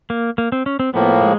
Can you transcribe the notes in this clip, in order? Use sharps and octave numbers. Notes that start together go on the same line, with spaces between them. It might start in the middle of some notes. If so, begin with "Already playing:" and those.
A#3
A#3
C4
C#4
C4
A2 F3 A#3 B3
G#3